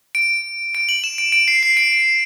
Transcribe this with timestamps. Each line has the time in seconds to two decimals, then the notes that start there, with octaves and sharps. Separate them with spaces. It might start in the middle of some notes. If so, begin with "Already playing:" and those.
0.15 D7
0.75 D7
0.89 F#7
1.04 E7
1.18 D7
1.32 D7
1.48 C7
1.63 C7
1.77 D7